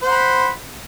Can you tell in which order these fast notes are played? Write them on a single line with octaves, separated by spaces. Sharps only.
C5 F#5 B5